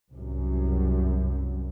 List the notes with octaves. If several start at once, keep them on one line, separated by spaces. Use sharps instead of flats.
C2 F#2